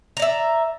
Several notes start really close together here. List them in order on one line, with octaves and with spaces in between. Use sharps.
A#5 D5 E5